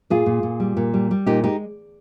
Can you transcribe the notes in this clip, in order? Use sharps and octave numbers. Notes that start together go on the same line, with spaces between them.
A#2 F4 G#4
A#2
A#2
G3
A#2
G3
G3
A#2 D#4 G4
G#3 D#4 G4